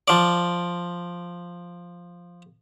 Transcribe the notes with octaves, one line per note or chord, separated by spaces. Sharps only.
F3 D5